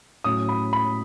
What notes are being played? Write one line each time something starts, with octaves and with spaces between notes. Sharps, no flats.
A2 F#3 C#4 D#6
B5
B5